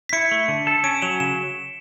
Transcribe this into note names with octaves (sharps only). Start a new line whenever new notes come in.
B6
E4 C#7
A3
D3
A4
C#4 D7
F#3 E7
C#3 E7